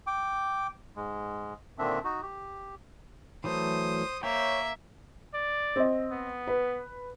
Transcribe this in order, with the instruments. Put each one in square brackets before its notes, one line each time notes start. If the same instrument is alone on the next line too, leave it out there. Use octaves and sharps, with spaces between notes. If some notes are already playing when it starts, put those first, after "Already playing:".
[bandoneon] G5 D6
G#2 G#3
A#2 D3 D#3 C4 D4 E5
D#4 F#4
G4
[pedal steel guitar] E3 F#3 A3 [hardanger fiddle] C5 D#6
[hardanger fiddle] A#3 E5 [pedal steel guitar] C#5 G5
[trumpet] D5
[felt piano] C4 D#5
[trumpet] B3
[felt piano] B4